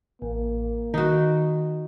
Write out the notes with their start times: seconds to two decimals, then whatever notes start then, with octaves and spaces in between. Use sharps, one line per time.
0.22 A1 A#3
0.94 D#3 D#4 F#4